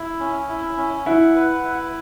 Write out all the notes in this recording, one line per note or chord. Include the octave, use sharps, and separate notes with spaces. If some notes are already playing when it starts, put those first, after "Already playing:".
Already playing: E4
C#4
E4
C#4
E4 F#5
B4
E4